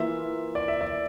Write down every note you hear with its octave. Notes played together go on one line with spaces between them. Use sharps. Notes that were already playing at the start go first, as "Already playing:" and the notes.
Already playing: E3 A#3 F4 E5
D5
E5
D5